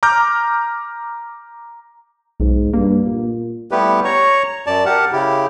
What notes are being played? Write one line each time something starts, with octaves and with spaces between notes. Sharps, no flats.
A#5 D6 F6 G6
B1 G#2
G2 A#3
A#2
G3 A3 B3 E4 G4 B4
C#5 A#5 C#6
F#2 D5 A5
G4 A#4 F#5 A5
C#3 E4 G4